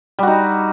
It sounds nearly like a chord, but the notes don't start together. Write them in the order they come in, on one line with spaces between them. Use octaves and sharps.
G3 F#4 D#4